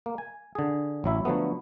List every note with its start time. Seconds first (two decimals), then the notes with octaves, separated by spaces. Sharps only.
0.06 A#3
0.18 G#5
0.55 D3 G#4
1.04 A1 F#3 E4 E5
1.25 D3 F3 F#3 A3 B3